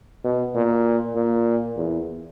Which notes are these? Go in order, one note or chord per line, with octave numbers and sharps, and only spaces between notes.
B2
A#2
A#2
E2